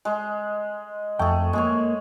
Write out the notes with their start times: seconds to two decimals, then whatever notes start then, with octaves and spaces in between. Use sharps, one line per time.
0.05 G#3
1.19 F2 A3 G#4 G5
1.53 G#3 A#3 G#4 C#5